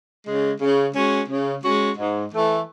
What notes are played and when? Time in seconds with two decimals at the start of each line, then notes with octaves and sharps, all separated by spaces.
0.25 C#3 G#3
0.60 C#3
0.93 G#3 C#4 F#4
1.28 C#3
1.63 G#3 C#4 F#4
1.98 G#2
2.32 E3 A3